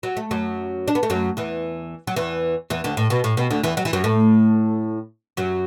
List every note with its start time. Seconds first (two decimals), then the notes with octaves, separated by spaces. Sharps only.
0.03 F#3
0.17 A3
0.31 F#2 F#3
0.88 D4
0.95 B3
1.03 A3
1.10 F#2 F#3
1.37 E2 E3
2.07 F#3
2.16 E2 E3
2.70 E2 E3
2.84 D2 D3
2.97 A2
3.10 B2
3.24 A2
3.37 B2
3.50 D2 D3
3.64 E2 E3
3.77 F#3
3.85 E3
3.93 F#2 F#3
4.04 A2 A3
5.37 F#2 F#3